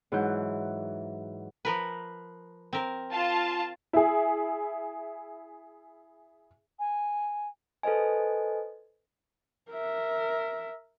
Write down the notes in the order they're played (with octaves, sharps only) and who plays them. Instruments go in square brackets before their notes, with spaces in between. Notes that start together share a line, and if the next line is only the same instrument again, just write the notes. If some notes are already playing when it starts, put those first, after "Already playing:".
[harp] G#2 E3 F#3 F#5 G6
[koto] F3 A#4 B4
C4 A#4
[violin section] F4 A5
[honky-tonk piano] E4 G#4
[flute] G#5
[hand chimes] A4 B4 C5 D#5 G#5
[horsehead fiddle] A#4 E5